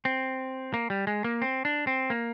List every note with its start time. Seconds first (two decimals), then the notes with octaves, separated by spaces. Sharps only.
0.05 C4
0.74 A#3
0.90 G3
1.07 G#3
1.24 A#3
1.42 C4
1.65 D4
1.87 C4
2.10 A#3